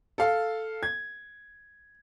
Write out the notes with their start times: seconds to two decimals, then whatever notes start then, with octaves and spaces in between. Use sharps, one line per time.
0.18 A4 F5
0.83 G#6